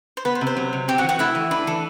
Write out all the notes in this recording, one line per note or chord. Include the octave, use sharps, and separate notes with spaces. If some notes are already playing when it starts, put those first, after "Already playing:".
C5
B3 B4
C5
C3
C5
F#3
C3
C4 G4 G5
F#4 F#5
E3
F#4 F#5
A3 E4 E5
E3
D4 B4
E3 A4